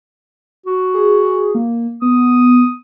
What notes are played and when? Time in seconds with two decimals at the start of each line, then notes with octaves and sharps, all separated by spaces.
0.66 F#4
0.94 G#4
1.55 A#3
2.02 B3 D#6